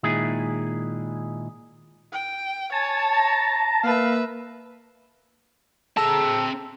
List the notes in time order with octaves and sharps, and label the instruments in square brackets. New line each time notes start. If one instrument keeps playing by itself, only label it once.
[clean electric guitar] A#2 D#3 G#3 E4 G#4
[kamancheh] G5
[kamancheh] C#5 [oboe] G#5 [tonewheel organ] A5
[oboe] A#5
[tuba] A#3 [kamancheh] B4 E5 [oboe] F5
[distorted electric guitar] C4 A#5 [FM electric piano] G#4 A4 [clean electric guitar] A5 [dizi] E6